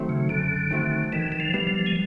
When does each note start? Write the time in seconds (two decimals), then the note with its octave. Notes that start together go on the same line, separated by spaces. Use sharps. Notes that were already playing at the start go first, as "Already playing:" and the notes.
Already playing: D#3 F#3 A3 C4
0.09 C#3
0.29 F#2 D3
0.71 D#3 F#3 A3 C4
1.12 D#3 E3
1.32 E3
1.40 F3
1.54 G3 B3
1.67 F3
1.86 G#3